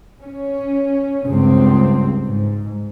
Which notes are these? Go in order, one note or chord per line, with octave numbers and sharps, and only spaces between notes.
C#4
C#2 G2 C4
G#2